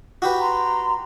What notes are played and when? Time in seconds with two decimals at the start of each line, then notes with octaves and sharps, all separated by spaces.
0.22 F#4 G4 B4
0.40 A#5 C6